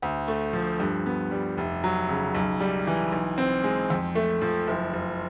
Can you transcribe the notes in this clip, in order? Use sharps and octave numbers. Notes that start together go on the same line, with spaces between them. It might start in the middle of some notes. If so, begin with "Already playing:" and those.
D2
A3
F3
G2
B3
G3
F1
F#3
C#3
B1
G3
E3
B1
C4
G#3
F2
A3
F3
F#1
F#1